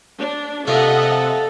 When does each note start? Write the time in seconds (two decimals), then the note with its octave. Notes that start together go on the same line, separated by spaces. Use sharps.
0.19 D4
0.67 C3 A3 F4 A4 A#4 D#5 E5 F#5